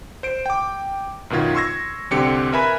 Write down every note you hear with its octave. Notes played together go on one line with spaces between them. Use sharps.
C5 D7
G5 D6
F#2 B2 D#3 F4 G#6
C6 C#6 E6 G#6 A#6
C2 D3 C4 G4 C#7
A#4 B4 E5 G#5 B5